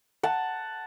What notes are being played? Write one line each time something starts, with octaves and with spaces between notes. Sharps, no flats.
F#5 A5